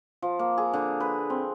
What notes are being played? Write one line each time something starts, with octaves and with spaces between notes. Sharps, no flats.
F3
A#3
G#4
D3
B4
C4